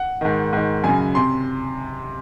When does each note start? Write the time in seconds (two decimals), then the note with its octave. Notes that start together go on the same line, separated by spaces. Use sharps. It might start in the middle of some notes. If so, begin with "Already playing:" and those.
Already playing: F#5
0.21 G#2 D#3
0.53 G#2 D#3
0.84 F#2 C#3 G#5
1.15 C3 C6